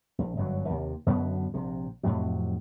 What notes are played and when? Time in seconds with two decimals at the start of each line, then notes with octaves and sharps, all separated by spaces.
0.18 A#1
0.36 G1 F#2 F#3
0.69 D#2 C3
1.06 F#2 B2 D3 B3
1.54 A#1 C3
2.03 F2 A2 C3 F#3